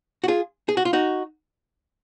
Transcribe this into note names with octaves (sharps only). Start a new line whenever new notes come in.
F#4
F4 G#4
G#4
F#4
F4
D#4 F#4